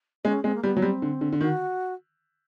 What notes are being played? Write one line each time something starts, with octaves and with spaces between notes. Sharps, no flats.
G#3 C#4
G#3 C4
A#3
G3 B3
F#3
G3 C4
D3
D3
D3
D#3 F#4